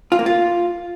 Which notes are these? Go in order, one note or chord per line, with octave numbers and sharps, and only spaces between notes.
F4
A#3
F4